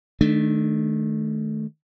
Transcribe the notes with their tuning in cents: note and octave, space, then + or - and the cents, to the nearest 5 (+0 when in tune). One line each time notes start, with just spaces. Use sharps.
D#3 +0 A3 -15 D4 +20